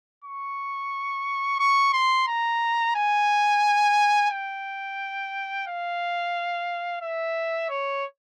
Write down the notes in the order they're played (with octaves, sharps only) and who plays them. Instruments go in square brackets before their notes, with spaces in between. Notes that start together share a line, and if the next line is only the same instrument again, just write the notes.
[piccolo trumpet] C#6
C#6
C6
A#5
G#5
G5
F5
E5
C#5